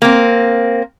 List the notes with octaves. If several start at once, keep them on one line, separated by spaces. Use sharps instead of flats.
A#3 C4